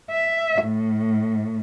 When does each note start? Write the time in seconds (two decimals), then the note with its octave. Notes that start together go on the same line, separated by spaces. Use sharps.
0.11 E5
0.64 A2